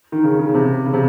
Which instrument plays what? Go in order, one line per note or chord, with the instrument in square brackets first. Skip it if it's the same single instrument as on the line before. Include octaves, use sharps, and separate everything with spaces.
[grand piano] D#3
C#3
C#3
C3
C#3
C3